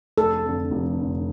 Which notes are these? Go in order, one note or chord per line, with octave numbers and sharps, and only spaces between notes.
F1 A4
F2 D3
F1
F2 D3